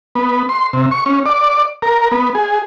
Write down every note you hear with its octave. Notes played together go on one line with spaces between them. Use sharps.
B3
C6
C3
C#6
C#4
D5
A#4
B3
G#4